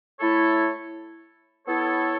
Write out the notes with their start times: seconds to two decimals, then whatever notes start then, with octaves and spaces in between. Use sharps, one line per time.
0.20 A3 E4 A4 C#5
1.67 B3 E4 A4 C#5